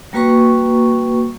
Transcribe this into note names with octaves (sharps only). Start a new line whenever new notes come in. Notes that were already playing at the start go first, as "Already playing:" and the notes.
G3 A#3 F#4 B4 A#5 C#6